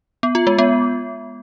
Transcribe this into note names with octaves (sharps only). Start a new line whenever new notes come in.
B3
F4
G#3
B3